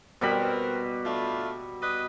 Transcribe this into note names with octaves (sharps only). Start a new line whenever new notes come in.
B2 G3 C4 A#4 B5
A3 D4 F4
B4 D5 D#5